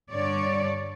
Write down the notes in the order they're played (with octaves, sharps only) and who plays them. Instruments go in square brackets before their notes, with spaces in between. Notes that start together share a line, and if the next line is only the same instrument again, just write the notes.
[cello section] G2 D3 C#5 D5